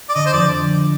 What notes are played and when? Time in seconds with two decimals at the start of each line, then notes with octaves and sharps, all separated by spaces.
0.09 D5
0.15 D3 D#5
0.26 C5
0.33 F2 D5